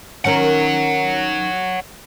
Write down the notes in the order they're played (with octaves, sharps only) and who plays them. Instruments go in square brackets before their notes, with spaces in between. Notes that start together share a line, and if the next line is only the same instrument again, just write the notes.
[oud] D#3 C#4 A#4 [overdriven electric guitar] C#5 F#5